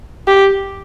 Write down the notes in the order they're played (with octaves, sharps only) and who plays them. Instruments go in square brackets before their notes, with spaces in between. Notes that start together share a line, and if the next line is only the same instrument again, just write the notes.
[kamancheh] G4